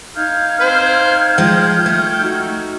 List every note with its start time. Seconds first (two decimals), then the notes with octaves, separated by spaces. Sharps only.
0.15 D#4 F5 F6 G6 G#6
0.61 C4 C5
1.38 F3 G#3 G5
1.86 A3
2.18 D#4 F#4